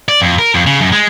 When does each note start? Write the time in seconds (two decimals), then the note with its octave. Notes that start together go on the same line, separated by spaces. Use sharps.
0.09 D5
0.21 F2
0.39 A#4
0.55 F2
0.67 C#3
0.81 F#2
0.92 G#3